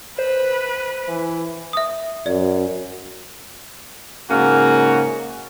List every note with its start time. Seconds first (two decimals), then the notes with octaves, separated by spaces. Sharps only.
0.18 B4 C5
1.08 E3
1.73 E5 D#6
2.26 F#2 D5
4.30 G#2 C#3 A#3 C#4 F#4